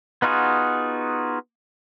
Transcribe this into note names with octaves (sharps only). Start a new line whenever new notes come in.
B3 D#4 F4 F#4 G#4